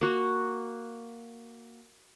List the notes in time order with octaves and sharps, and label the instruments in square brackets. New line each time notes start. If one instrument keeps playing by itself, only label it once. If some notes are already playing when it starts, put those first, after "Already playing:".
[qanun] A#3 F#4